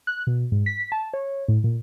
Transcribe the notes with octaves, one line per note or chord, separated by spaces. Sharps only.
F#6
B2
G#2
B6
A5
C#5
A2
A#2